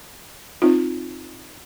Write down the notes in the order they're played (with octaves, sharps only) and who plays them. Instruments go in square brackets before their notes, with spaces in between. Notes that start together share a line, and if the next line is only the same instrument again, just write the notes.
[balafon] C4 D#4 F4